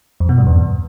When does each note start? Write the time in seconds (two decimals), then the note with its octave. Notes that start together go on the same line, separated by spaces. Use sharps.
0.20 F2
0.29 B2
0.38 G2
0.46 E2